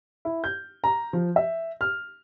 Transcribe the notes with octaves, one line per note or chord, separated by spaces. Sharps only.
E4
G6
A#5
F3
E5
F6